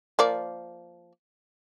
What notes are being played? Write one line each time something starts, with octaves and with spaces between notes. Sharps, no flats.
F3 A#3 D5